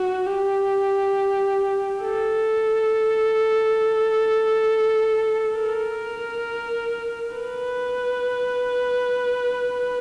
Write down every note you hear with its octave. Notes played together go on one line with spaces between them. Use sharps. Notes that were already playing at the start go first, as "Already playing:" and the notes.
Already playing: F#4
G4
A4
A#4
B4